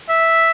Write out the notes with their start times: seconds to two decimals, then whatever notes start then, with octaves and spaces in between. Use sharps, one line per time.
0.09 E5